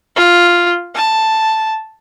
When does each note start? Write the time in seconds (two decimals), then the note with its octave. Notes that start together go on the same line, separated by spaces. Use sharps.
0.16 F4
0.95 A5